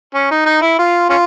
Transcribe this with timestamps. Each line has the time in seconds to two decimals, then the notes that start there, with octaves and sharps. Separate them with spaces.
0.14 C#4
0.31 D#4
0.46 D#4
0.62 E4
0.79 F4
1.10 C#4 F4